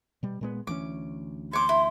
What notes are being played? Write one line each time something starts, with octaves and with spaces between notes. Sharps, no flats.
B2 G3
A#2 G#3 B3
D2 E3 C#4 D6
C#5 C6 D6
E4